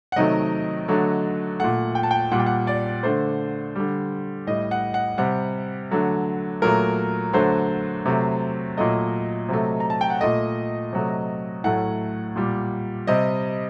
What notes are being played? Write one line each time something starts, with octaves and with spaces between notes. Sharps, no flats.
F#5
C3 D#3 F#3 A3 D#5
D3 F#3 A3
A#2 A3 F#5
G5
A5
G5
A#2 G3 F#5
G5
F#5
D5
D3 A3 C5
D3 G3
A2 G3 D#5
F#5
F#5
C3 G3 F#5
D3 F#3 A3
A#2 F#3 A3 A#4
D3 F#3 A3 C5
C3 F#3 A3
A#2 F#3 A3 D#5
C3 F#3 A3
A#5
A5
G5
F#5
A#2 A3 D#5
C3 F#3 A3
A2 F#3 A3 F#5
A#2 G3
C3 G3 D#5